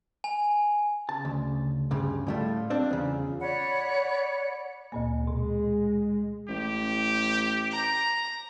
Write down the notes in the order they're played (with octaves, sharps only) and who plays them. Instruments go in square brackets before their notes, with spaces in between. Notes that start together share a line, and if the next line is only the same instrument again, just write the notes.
[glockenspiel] G#5
[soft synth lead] C#3 [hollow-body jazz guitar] A5
[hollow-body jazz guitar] D2
D2 G2 C#3
[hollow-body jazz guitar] A2 G3 A3 [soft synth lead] F4
[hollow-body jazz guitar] G3 C4 D4
E2 C#3
[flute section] C#5 D5 F#5 B5
[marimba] D2 A#2 A#3
[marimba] B2 [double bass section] G#3
[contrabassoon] A1 [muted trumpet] G4
[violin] A#5